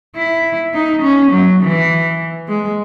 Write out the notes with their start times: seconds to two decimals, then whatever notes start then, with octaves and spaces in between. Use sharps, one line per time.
0.16 E4
0.74 D#4
1.02 C#4
1.31 F#3
1.61 E3
2.48 G#3